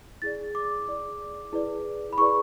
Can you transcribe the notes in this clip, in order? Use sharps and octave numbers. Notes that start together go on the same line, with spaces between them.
E4 G#4 D5 A6
D6
E4 G#4 D5
E4 G#4 B4 D5
B5
E4 G#4 B4 D5 C#6